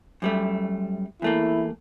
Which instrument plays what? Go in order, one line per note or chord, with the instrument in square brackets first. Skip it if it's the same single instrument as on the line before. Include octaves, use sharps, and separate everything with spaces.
[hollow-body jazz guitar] F#2 G3 A3
[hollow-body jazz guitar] E2 A3 A#3 [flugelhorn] E4